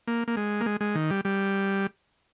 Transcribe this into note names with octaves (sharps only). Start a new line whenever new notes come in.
A#3
A#3
G#3
A#3
G#3
G#3
D#3
G3
G3